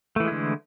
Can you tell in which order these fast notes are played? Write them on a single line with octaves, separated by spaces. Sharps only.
A3 E3 G#3 E4 D3